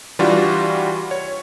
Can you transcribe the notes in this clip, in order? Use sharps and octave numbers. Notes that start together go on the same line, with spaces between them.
E3 G3 D4 F4 F#4
C#5